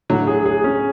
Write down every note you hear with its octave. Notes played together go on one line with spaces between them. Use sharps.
A2 D3 F#3
G#4
G#4
C#4